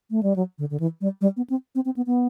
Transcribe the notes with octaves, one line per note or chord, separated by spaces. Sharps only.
A3
G3
F#3
D3
D3
E3
G3
G3
B3
C4
C4
C4
B3
B3